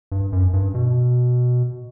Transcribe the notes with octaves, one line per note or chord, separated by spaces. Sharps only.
G2
F#2
G2
B2